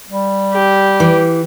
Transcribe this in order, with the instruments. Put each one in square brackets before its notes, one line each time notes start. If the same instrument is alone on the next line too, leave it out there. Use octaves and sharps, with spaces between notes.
[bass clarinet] G3
[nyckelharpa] G4
[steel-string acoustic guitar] E3